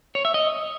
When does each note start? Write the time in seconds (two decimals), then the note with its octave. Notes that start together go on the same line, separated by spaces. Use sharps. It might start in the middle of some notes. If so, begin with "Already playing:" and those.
0.15 C#5
0.25 E5
0.34 D#5